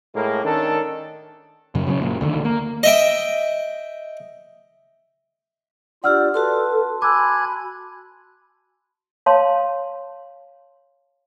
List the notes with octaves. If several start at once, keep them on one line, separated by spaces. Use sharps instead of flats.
A2 G#3 A#3
D#3 C#4 D4 A4
F#2 C#3
C#3 F#3 B3 C#4
F#1 A#2
D2 D3 D#3
A#3
D#5 E5 G5
D4 F4 G4 D5 F#5 E6 F6
F#4 A4 B4 A5 C6
G#5 B5 D6 E6 F#6 G#6
C#5 F5 A5 C6